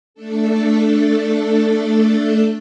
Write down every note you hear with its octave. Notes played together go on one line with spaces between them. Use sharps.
A3 D4 A4